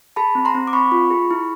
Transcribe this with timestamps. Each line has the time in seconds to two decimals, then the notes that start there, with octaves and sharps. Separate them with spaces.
0.16 G#4 A5 B5
0.35 C4
0.45 A#5 C6
0.55 C4
0.67 D6
0.73 C4 B5 C#6
0.92 F4
1.10 G#4
1.31 E4